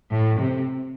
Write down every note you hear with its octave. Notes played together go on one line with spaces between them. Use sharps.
A2
C3